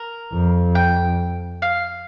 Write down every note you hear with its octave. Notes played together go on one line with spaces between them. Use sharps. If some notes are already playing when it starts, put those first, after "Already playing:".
Already playing: A#4
F2
G5
F5